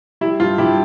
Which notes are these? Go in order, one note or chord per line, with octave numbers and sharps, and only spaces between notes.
G3 E4
G2 F4
G2 E4 G4